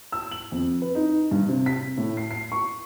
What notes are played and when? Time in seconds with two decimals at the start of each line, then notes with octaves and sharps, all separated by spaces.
0.12 E6
0.32 F#7
0.52 F2
0.82 B4
0.95 D#4
1.31 G2
1.49 C3
1.66 B6
1.98 A2
2.17 C7
2.31 C7
2.52 C#6